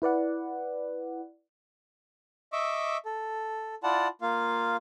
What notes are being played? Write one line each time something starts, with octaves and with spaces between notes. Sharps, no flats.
E4 B4 D5 F#5
D#5 E5 C#6 D6 E6
A4
E4 F4 D5 F#5 A5
A#3 F4 F5